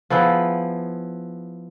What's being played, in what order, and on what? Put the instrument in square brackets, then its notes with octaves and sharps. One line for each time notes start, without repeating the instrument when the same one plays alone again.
[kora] F3 B3 E4 G#4